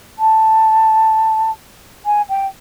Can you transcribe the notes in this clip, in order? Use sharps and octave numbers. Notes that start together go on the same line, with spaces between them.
A5
G#5
G5